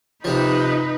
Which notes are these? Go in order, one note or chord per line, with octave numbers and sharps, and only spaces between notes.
C3 F3 D#4 B4